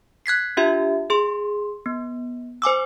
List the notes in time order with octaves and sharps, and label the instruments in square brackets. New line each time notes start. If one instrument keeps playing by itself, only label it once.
[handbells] F#6 G#6 B6 C7
D4 F4 G4 E5
G#4 C6
B3
C5 G#5 D6 E6